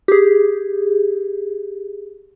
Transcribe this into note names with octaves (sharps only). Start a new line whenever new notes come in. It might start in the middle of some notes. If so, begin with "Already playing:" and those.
G4 G#4